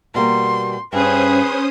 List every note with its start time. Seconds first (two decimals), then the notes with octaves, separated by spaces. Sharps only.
0.15 B2 G3 A#3 C6
0.93 G2 C#4 G#4 B4 C5 D#6